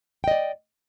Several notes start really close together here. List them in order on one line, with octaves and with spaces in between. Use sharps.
G5 D#5 D5